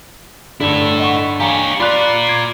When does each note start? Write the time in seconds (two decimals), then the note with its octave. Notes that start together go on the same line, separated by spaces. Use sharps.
0.60 G2 D3 E4 A4
1.00 D#5 F#5 C#6
1.40 G4 C#5 F5 G#5 A#5
1.80 F4 A#4 D5 B5 C6 F#6
2.27 D6 G#6 D7